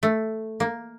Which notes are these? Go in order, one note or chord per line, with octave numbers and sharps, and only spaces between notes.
A3
A#3